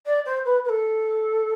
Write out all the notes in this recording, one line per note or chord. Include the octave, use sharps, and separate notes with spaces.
D5
C5
B4
B4
A4